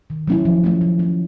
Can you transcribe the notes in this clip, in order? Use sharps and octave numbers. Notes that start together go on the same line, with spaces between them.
D#3
F#3 A3 C#4 E4
F3
A3 C#4
F3
A3 C#4